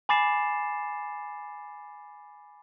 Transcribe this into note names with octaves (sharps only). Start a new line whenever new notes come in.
G#5 B5 D6 A6 C7 E7